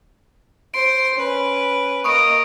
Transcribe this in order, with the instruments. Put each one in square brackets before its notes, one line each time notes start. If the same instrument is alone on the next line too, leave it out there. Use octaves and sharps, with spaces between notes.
[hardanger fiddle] C5 C6 [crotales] D7
[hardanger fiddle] C#4 B4
[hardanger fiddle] A#3 D#5 [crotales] C#6 D#6 D7